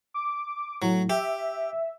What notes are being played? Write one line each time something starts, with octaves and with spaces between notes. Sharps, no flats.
D6
A2 F#3
G4 E5